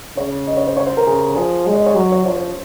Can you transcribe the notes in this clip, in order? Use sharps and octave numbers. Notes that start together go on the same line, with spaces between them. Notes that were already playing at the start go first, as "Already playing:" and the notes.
C#3 C#5
D#5
C#5
C5
C#5
C5
A#4
C#3 G#4
F3 G#4
G#3 C#5
D#5
C#5
F#3
C#5
F3 C#5
C5